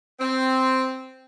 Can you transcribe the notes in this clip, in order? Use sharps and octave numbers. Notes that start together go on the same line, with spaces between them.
C4